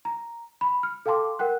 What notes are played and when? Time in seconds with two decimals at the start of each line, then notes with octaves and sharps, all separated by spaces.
0.05 A#5
0.61 B5
0.83 F6
1.06 A4 F5 G5 A5 C6 D6
1.39 A#4 F#5 G5 F#6